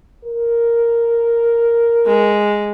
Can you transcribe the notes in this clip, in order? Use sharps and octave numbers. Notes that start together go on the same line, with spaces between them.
A#4
G#3